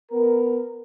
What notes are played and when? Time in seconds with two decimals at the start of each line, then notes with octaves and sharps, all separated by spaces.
0.11 B3 A#4